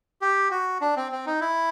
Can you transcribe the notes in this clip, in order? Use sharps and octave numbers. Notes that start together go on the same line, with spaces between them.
G4
F#4
D4
C4
C4
D#4
E4